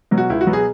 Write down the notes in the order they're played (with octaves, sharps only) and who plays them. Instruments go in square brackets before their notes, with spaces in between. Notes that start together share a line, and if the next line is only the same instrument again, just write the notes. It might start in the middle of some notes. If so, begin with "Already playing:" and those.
[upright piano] B2 F#3
F#4
C#2 E4
F#4
B2 F#3 B3
G#4